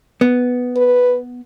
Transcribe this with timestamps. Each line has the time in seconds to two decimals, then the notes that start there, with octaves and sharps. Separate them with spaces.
0.21 B3
0.76 B4